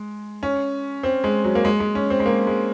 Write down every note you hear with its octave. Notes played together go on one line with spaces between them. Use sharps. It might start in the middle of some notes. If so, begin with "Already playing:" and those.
Already playing: G#3
C#4
C4
G#3
F#3
A#3
G#3
G#3
C#4
C4
G#3
A#3
G#3